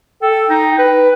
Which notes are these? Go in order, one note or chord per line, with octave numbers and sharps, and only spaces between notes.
A4 G5
D#4
B4 G5